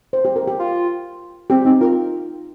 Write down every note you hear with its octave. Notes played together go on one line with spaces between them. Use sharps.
C5
G4
A#4
G4
F4
C4 G4
C4 D#4
F4 A#4